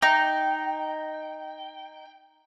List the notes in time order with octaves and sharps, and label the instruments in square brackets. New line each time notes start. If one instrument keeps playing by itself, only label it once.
[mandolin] D#4 [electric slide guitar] G5